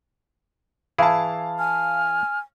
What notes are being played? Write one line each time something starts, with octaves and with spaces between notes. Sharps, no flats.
E3 E4 G#4 F5 A5
G#5 F6